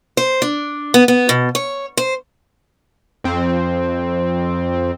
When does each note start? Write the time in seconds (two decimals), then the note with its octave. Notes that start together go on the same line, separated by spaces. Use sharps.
0.17 C5
0.42 D4
0.94 B3
1.08 B3
1.29 B2
1.55 C#5
1.97 C5
3.24 F2 C4